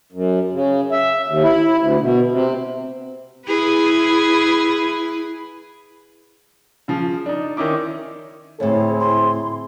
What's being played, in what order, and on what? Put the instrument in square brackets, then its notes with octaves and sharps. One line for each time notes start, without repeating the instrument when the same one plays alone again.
[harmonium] F#2
C#3
E5
D#2
E4
D2
B2
C3
[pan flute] E4 [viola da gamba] G#4 B4
[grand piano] C#3 F3
D4 D#4
D#3 C#4 D#4 E4 D6
[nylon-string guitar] D2 A2 [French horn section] C4 E4 G#4 [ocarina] C#5
[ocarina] C6